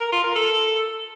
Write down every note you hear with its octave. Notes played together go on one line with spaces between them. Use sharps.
A#4
F4
A#4
A4